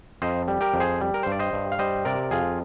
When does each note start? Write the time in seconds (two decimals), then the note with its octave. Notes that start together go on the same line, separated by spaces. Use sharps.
0.22 F2 C5 D#5
0.48 G3
0.61 G4 A#4
0.74 F2
0.80 G#4 C5
1.01 G3
1.14 A#4
1.23 G2 C5
1.32 D5
1.39 C5 D#5
1.53 G2
1.72 F5
1.79 G3 C5 D#5
2.05 C3 A#4 D5
2.31 F2 F4 G#4